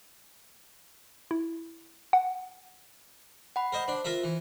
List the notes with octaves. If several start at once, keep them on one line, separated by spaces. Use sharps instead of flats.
E4
F#5
F#5 B5
A#4 C5 D#5
D4 C5
F4 A#4 E5
E3